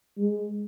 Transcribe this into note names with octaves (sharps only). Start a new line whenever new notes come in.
G#3